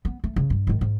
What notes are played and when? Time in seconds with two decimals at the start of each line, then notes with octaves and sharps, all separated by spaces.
0.05 B3
0.24 A3
0.36 C#3
0.50 G2
0.67 G#2 D#3
0.81 G#2